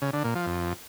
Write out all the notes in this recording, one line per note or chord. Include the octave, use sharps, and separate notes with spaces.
C#3
D3
A#2
F3
F2